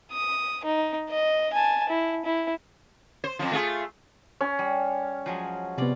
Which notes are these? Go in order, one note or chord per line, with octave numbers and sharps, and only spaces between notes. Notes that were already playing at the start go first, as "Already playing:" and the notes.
D#6
D#4
D#5
G#5 A5
E4
E4
C5
F2 F3
A3 F4 G#4
C#4
G3
F3 F#3 G#3
C3 B3 F4 D5